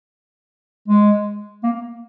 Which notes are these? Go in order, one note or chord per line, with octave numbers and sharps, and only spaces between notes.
G#3
A#3